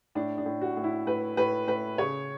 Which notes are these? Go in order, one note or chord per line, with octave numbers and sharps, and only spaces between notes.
A2 D4
D4
A2
F#4
A2
E4
A2 B4
A2 B4
A2 B4
C#3 C#5